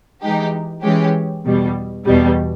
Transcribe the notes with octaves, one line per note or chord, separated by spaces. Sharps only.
E3 G#3 D#4 G4
E3 G#3 C#4 G4
E2 B2 G3
E2 B2 G3